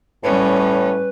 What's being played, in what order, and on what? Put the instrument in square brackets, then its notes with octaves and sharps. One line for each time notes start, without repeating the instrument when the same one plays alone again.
[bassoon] A2 [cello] G3 C#4 [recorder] B4